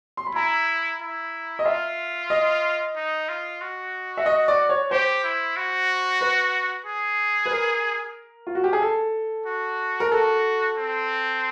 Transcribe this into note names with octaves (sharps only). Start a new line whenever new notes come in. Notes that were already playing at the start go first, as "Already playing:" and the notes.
C6
B5
E4 A#5
E4
D#5
F4 E5
D#5
D#4
F4
F#4
E5
D#5
D5
C#5
G4 C5
E4
F#4
B4
G#4
B4
A#4
F4
F#4
G4
G#4
A4
F#4
A#4
F#4 A4
C4